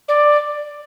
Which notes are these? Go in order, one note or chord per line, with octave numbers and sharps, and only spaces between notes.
D5